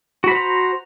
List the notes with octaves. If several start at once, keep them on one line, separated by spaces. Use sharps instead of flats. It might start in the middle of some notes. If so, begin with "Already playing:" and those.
F#4 C5 A#5 B5